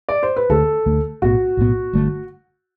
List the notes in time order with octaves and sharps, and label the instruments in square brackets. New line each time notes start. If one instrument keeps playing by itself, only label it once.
[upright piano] D5
C5
B4
[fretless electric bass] D2 D3 A3 [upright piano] A4
[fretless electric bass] D2 D3 A3
[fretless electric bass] B1 A2 E3 B3 [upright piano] F#4
[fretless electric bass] B1 A2 E3 B3
G1 G2 D3 A3